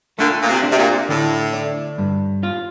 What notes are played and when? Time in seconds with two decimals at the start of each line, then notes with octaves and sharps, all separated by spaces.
0.18 A#2 D3 A3
0.42 A#2
0.49 C3
0.63 D4
0.71 C3
0.78 A#2
1.09 A2 D3
1.53 D4
1.98 G2
2.43 F4